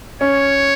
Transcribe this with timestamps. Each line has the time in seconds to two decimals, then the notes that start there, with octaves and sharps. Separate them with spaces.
0.21 C#4 C#5